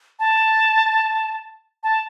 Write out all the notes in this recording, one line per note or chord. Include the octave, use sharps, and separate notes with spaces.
A5
A5